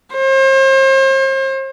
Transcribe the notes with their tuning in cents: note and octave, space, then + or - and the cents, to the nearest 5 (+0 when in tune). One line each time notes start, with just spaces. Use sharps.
C5 +40